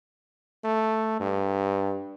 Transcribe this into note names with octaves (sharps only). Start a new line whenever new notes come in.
A3
G2